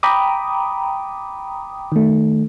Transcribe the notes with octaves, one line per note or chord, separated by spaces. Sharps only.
G5 A#5 B5 D6 D#6
D#3 A3